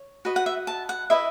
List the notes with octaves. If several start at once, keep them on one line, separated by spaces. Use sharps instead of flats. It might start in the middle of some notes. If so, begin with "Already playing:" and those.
Already playing: C#5
F#4 B4 D#5
F#5
E5
A5
F#5
E4 B4 D#5 E5